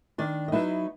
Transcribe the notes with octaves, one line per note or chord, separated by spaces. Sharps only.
D#3 D4 D5
D#5
F#3 B3 D#4 E4 E5